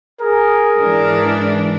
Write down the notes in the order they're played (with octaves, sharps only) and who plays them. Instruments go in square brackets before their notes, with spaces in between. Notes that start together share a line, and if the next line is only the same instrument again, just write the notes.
[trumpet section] G#4 A#4
[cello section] G#2 E3 D4